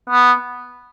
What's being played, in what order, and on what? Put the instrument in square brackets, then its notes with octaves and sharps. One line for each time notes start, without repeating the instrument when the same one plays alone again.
[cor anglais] B3